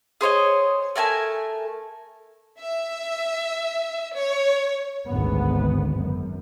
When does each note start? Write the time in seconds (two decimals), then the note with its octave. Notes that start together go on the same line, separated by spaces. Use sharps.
0.21 G#4 C5 C#5 D#5
0.96 A3 A#4 G#5 A5
2.60 E5
4.16 C#5
5.08 G#1 D2 B3
5.97 F#2